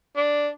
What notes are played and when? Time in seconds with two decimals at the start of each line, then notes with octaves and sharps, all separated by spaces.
0.17 D4